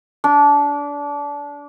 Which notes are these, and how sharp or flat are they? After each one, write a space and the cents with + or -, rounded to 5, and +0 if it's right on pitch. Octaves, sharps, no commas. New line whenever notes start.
D4 -25